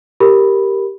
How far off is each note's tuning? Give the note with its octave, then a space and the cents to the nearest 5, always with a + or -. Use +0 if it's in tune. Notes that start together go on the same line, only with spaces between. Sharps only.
G4 +0 A#4 -5 B5 +0